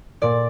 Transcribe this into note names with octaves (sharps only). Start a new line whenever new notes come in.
A#2 D5